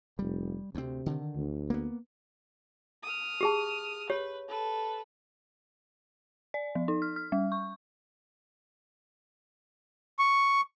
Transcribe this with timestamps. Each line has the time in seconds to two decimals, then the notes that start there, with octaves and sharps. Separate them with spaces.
0.19 F1 G3
0.75 D2 C3 C4
1.06 D3 D#3
1.35 D2
1.70 A#3 B3
3.03 D#6 F6
3.41 G4 G#4 A5
4.10 G4 B4 C#5
4.48 A4 B4
6.54 D5
6.75 F3
6.88 D#4
7.02 F6
7.16 F6
7.32 G3
7.52 C#6
10.19 C#6